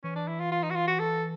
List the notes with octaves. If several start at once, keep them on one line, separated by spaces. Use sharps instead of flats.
E3 C#4
D4
E4
F4
F4
D#4
F#4
F4
F#4
A4